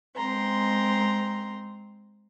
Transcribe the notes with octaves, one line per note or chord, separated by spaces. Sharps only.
G#3 C4 A#5 C6